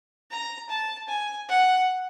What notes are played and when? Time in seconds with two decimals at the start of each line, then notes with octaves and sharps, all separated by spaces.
0.31 A#5
0.69 A5
1.08 G#5
1.48 F#5